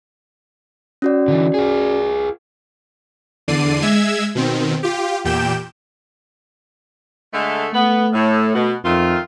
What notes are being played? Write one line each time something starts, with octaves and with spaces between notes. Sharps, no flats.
C#4 F#4 D5
D3 E3
F4 G#4
E2 D3 D5 C7 D#7
G#3 E5 E6 G#6
B2 D#3 C4
F4 G4
E2 A#2 G4 G5 G6 E7
D3 G#3 A3
A3 B3
A2
B2
F2 D#3 A3 F4